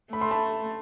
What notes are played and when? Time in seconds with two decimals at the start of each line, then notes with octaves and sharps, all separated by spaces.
0.12 A3 B5
0.21 C6
0.31 A5 B5